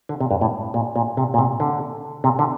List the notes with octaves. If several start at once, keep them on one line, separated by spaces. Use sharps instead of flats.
D3
C3
G2
A2
A#2
A#2
C3
A#2
C3
D3
C3
D3